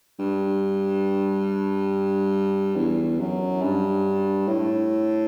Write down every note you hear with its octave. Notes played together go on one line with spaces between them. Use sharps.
G2
E2
F#2
G2
A2